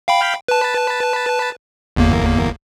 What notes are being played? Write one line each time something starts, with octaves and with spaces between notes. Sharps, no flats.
F5 G5 B5
B4 A5
G1 E2 A#3